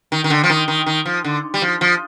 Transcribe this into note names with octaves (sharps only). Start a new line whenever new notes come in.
D#3
D#3
D3
F3
D#3
D#3
D#3
F3
D3
G3
F3
F3